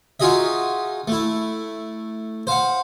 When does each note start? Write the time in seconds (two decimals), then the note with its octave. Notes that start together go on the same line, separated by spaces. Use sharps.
0.20 D#4 F4 F#4 G#4 D#5 E5
1.08 A3 E4
2.47 C5 F5 F#5